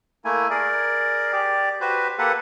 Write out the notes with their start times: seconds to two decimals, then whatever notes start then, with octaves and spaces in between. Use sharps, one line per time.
0.25 A3 A#3 E4 G#5
0.50 G#4 A#4 D5
1.33 G4 D5
1.81 F#4 G4 B4 C5
2.19 A#3 G4 A4 B4 F#5